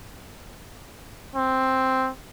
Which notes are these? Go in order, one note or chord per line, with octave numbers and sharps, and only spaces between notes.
C4